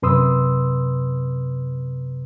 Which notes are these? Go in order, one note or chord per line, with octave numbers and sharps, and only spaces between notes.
F#2 C3 B4 C6 D#6 E6